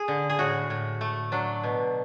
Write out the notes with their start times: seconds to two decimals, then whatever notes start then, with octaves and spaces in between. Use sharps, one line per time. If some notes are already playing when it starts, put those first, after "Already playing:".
Already playing: G#4
0.08 D3
0.30 G#4
0.39 A2 F#4
0.70 A2
1.01 A3
1.32 F#3 D4
1.63 B2